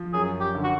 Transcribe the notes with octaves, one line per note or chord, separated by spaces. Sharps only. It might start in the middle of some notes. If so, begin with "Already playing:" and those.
Already playing: F3
F#2 G#4
G4
D3
F#4